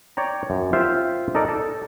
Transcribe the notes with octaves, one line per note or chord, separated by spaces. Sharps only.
C#5 D5 G5 A#5
F#2
F4 G4 C5 E5 F5
D#4 A4 A#4 D5
A4